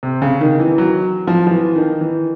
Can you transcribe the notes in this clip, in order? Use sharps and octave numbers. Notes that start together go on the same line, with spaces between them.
C3
C#3
D#3
E3
F#3
F3
F3
E3
D#3
E3